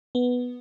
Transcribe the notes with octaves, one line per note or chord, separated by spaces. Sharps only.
B3